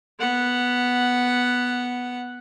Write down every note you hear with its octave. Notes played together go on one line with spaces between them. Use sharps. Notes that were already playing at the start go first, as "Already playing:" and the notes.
B3 F#5